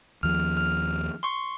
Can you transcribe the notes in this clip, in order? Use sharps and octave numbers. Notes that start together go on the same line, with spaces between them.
D#2 F3 F6
F6
C6 C#6